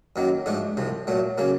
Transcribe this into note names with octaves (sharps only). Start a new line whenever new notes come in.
F#2 D#3 F#3 A#3
G#2 F3 A3 D4
C2 C3 F3
A#2 F#3 A3
C#3 F#3 A#3